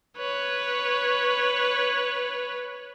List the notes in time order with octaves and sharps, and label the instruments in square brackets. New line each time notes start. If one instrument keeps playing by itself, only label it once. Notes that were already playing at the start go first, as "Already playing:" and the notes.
[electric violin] B4 C#5